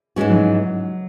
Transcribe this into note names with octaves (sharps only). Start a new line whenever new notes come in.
G#2 E3 G#3 C#4 F#4
F#3